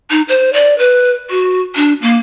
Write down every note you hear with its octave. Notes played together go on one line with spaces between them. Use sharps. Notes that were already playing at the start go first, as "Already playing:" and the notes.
D#4
C5
D5
B4
F#4
D4
A#3